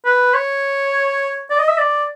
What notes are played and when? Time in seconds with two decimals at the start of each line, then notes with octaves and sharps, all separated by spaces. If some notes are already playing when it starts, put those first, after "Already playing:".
0.05 B4
0.34 C#5
1.50 D5
1.59 D#5
1.69 E5
1.78 D5